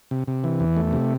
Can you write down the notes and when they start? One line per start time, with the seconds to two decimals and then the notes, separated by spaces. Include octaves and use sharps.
0.11 C3
0.27 C3
0.44 E3
0.60 E2
0.76 A3
0.93 C3